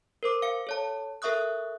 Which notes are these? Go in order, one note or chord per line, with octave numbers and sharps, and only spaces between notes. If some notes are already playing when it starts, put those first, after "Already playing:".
A#4 C5 D6
F5 C#7
A4 C#5 A5
A4 A#4 E5 C#6 D#6 F#6